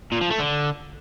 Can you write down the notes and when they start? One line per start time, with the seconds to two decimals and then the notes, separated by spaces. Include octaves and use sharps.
0.12 A#2
0.21 F3
0.30 A3
0.39 D3